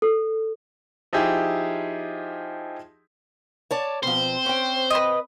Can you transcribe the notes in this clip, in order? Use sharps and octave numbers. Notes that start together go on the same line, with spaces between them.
A4
F3 D#4 E4 G4 G#4
C#5 D5 A5
B2 F3 C4 C5
C#4 G5
B4 D#5